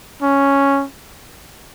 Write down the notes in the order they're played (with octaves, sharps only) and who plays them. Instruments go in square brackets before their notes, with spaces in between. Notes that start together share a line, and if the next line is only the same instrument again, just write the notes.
[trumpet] C#4